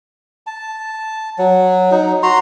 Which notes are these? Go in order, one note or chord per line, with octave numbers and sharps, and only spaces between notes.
A5
F#3
F#3 D#4
F#4 A#5 C6